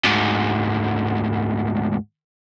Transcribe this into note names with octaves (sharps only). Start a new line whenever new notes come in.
D2 G#2